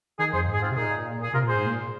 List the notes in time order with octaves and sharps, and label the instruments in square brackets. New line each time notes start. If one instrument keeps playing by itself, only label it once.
[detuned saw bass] D#3 [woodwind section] D#4 G#4
[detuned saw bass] F2 [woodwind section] G#4 C5
[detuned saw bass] G#2
[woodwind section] G#4
C4 F4
[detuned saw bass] C3
[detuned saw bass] A#2 [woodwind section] D#4 G#4
[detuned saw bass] A#2
[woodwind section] G#4
[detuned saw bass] C3 [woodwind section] F4 A#4
[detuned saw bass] A#2 [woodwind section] G#4 C5
[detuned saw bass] G#2
A#2